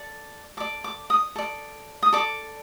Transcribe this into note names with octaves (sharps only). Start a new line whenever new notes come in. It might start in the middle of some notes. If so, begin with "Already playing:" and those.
Already playing: A4 D5
A4 D5 D6
D6
D#6
A4 D5
D#6
A4 D5 D6